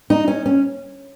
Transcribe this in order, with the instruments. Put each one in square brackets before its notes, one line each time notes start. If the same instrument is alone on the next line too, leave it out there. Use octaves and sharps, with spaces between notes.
[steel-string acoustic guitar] D#4
C#4
C#4